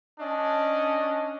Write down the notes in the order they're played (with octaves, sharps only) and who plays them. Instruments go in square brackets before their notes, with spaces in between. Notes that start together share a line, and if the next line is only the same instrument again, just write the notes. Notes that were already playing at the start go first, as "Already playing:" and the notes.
[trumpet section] C#4 D4 D#5